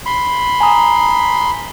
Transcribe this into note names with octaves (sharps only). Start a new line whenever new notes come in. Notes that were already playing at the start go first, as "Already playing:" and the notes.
B5 C6
G#5 A#5 D#6